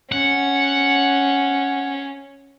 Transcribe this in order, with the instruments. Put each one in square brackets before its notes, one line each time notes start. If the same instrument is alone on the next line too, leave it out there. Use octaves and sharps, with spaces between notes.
[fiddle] C#4 [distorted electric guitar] F#5